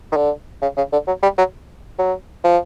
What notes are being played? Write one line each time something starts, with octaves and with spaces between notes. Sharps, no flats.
D#3
D3
C#3
C#3
D3
F#3
G3
F#3
F#3
F3